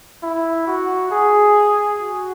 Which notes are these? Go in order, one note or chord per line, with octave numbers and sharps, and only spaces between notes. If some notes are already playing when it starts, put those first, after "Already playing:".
E4
F#4
G#4
F#4